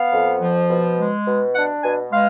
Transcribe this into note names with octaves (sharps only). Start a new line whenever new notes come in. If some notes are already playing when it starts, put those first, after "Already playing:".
Already playing: B3 F5
F2
F3
B2
G#3
B2
D4 F#5
B2 G#5
G#3 F5